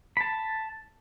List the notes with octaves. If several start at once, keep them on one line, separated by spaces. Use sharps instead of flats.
A5 B5